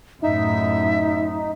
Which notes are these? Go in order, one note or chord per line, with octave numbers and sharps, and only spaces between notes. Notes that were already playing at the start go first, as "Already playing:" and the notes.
F#2 A2 D#4 E5